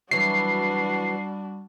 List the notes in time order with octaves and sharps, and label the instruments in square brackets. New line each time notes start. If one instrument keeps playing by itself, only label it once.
[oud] E3 F#3 [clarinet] G3 [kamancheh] D4 F#4 [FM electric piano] C7